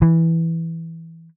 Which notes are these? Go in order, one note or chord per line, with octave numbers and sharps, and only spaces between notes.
E3